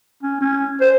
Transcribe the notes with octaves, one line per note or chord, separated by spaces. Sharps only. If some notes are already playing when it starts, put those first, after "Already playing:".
C#4
C#4
C5